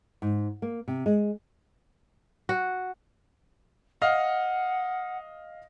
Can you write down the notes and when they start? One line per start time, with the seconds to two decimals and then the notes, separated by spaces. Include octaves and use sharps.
0.22 G#2
0.62 A#3
0.88 C3
1.06 G#3
2.49 F#4
4.02 D#5 F5 F#5 F6